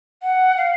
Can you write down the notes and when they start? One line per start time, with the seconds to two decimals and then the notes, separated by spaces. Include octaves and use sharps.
0.22 F#5
0.57 F5